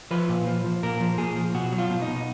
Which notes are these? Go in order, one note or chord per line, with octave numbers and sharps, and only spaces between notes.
F3 B4
A#2
F3
F3
A#2 A#4
F3
A#2 G#4
F3
B2 F#4
F#3
F4
B2
D#4
B2